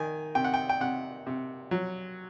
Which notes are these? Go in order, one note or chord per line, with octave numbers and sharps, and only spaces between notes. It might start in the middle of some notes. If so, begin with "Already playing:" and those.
Already playing: D#3 G#5
C3 G5
F#5
G5
G5
C3 F#5
C3
F#3